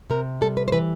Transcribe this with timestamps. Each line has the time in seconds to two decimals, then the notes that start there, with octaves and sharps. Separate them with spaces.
0.10 C3 A#4
0.41 G3 A4
0.57 B4
0.68 C5
0.72 E3 B4